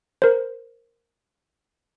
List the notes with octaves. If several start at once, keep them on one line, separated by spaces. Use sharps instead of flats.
A#4 C5